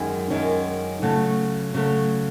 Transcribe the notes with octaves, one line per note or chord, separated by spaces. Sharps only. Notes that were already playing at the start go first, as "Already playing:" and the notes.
Already playing: F#2 D#3 G#3 C#4
F#2 D#3 G#3 C#4
C#3 F#3 A3
C#3 F#3 A3